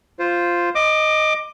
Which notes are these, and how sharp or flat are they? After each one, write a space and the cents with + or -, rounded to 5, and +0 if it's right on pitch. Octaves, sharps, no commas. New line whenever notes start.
F4 -5 C5 +0
D#5 +0 D6 +20